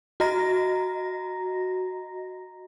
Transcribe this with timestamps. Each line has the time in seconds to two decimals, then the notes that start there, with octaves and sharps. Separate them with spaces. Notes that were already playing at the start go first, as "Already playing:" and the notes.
0.20 F#4 D#5 A#5 A#6